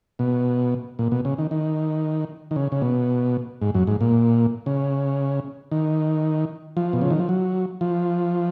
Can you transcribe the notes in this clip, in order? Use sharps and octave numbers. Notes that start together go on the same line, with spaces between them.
B2
A#2
B2
C#3
D#3
D#3
D#3
C#3
C#3
B2
G#2
F#2
G#2
A#2
C#3
D#3
F3
B2
C#3
D#3
F3
F#3
F3